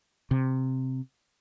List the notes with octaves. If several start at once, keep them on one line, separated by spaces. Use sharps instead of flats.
C3